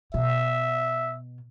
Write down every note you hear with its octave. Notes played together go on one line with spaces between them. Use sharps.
B2 E5